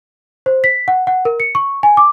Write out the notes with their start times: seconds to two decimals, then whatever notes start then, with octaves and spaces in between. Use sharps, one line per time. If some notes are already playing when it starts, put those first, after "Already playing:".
0.46 C5
0.64 B6
0.88 F#5
1.07 F#5
1.25 A#4
1.40 C#7
1.55 C#6
1.83 G#5
1.97 D6